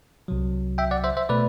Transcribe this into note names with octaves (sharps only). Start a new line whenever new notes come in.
C2 C3 F#3
E5 G5
D5 F#5
C5 E5
C5 E5
B2 A3 B4 D5